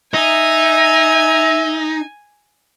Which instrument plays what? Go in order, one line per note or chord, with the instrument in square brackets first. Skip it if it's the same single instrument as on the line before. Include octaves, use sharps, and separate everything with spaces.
[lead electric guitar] D#4 [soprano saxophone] E5 [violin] G#5